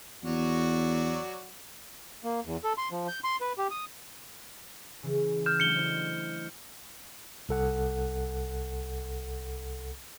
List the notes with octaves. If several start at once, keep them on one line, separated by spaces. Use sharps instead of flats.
E2 F#3 F#4 D5
A#3
E2
A4
C6
F3
G6
C6
B4
G4
D#6
C#3 E3
F6 G6 E7
F#3 A3 D4 C#7 G7
E4 C5 D#5
C2 A4 F#5